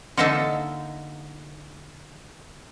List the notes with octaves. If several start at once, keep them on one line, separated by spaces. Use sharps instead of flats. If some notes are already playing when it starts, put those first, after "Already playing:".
D3 A#3 D#4 D#5 E5 A5